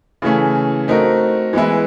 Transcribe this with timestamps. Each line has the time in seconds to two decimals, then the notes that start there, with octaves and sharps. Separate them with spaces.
0.22 C#3 E3 A3 C#4
0.88 A3 C4 D#4 F#4 A#4
1.53 E3 G#3 B3 E4